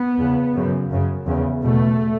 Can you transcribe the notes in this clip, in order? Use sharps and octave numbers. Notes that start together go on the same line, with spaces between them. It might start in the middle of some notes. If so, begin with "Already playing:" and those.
Already playing: B3
E2 C#3
F#2 C#3
F#2 C#3
E2 C#3
E2 B2 A3